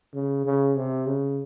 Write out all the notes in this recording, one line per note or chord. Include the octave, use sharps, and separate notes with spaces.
C#3
C#3
C3
C#3